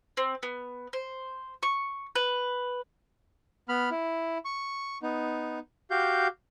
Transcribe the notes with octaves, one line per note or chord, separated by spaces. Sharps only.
C4
B3
C5
C#6
B4
B3 B5 F6
E4
C#6
B3 D#4
F#4 G4 F5 G6